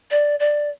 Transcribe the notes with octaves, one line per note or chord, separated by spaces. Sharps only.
D5
D5